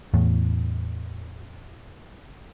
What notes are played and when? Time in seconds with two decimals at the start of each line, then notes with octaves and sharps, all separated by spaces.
0.14 E2 A2